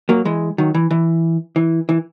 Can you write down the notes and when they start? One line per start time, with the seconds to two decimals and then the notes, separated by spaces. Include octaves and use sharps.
0.09 F#3 A#3
0.25 E3 G#3
0.58 D#3 F#3
0.74 E3
0.91 E3
1.56 E3
1.89 E3